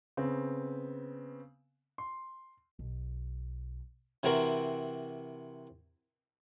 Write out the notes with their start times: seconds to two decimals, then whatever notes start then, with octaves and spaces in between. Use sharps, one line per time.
0.17 C#3 B3 C4
1.98 C6
2.79 B1
4.23 C3 E3 C4 F#4 A#4